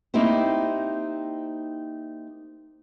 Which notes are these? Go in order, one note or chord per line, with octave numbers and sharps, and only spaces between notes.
A#3 C4 D#4 E4 G4 C5